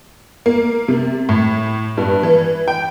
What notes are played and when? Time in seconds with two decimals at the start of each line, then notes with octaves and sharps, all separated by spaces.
0.46 A#3
0.88 C3
1.29 A2
1.98 G2
2.23 E3
2.68 G5